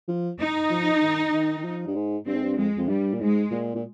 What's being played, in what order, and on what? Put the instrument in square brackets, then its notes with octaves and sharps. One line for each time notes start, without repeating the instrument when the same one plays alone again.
[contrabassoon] F3
[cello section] D#4
[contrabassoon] F3
D#3
D#3
D#3
F3
G2
G#2
[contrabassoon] G2 [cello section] C4
[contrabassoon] G#2
G2
[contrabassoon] F2 [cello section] G#3
[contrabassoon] F2
[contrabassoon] G2 [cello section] G3
[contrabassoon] A#2
[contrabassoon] G#2 [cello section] G#3
[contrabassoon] A#2
A#2